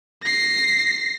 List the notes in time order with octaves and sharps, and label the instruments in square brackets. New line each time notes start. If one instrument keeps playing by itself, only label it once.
[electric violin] A#6 C7